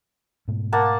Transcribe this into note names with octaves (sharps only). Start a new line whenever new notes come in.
G#2 B2 A3
A#3 F#5 A5